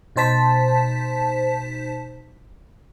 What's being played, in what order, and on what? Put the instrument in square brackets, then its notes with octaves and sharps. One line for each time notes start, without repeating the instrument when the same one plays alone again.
[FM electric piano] B2 D#4 C5 A5 B6